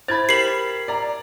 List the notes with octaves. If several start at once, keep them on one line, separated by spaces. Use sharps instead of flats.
E4 C5 B5 G#6 A6
G4 A#4 B6 C7 F#7
D5 A#5